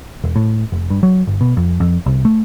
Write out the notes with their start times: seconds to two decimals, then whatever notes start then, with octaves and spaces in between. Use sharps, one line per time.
0.24 E1
0.36 A2
0.72 F1
0.90 G2
1.03 F#3
1.27 G1
1.41 B2
1.57 F2
1.80 F2
2.06 C2
2.25 A3